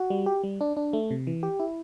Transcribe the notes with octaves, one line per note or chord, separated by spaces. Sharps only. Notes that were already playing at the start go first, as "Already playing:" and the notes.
Already playing: F#4
G3
G4
G3
D4
D4
A3
C3
E3
G4
E4